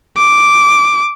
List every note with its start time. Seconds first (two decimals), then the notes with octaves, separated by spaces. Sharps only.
0.17 D6